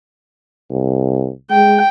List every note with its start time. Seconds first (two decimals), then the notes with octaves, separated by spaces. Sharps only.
0.71 C2
1.51 G#3 G5